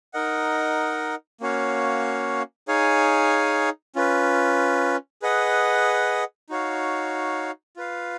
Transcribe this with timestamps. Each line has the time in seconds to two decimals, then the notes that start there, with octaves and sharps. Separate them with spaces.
0.13 D#4 A#4 D#5 F#5
1.41 A#3 C#4 F#4 C#5 F5
2.68 D#4 G#4 C#5 F5 G#5
3.95 C#4 F4 B4
5.22 G#4 B4 D#5 F#5
6.49 D#4 F#4 C#5 F5
7.76 F4 B4 F5